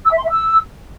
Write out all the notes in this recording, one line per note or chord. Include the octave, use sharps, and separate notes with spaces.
E6
E5
C6
E5
E6